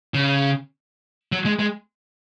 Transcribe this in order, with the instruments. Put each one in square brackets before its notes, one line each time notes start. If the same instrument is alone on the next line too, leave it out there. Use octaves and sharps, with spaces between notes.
[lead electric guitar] C#3
F#3
G#3
G#3